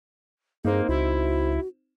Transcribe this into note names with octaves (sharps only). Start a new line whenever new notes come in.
G2 A#3 C4 D#4 G#4
C#2 E4 F#4